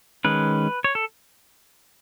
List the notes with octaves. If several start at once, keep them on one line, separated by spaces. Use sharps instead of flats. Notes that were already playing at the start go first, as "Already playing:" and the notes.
D#3 G#3 C#4 B4
C#5
A4